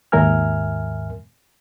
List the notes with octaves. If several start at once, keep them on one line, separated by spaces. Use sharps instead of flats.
D#2 G#2 A#4 E5 G#5 F6